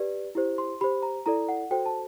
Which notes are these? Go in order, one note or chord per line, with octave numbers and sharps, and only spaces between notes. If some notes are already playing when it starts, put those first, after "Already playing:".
Already playing: G4 B4 D5
E4 G4 C5
C6
G4 C5 B5
A#5
E4 A4 D5 A#5
F#5
F#4 A4 C5 G5
A5